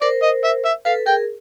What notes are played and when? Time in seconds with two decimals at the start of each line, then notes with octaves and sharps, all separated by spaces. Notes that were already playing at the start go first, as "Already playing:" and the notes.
0.01 A#4 C5 D5
0.22 D#5
0.44 E5
0.65 E5
0.85 A4 B4 F5
1.06 G#4 A#4 G5